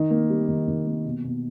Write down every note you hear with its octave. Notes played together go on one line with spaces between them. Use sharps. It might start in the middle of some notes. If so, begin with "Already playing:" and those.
Already playing: D#3 D#4
A#3
G3
D#3
D#3
A#3
B2
B2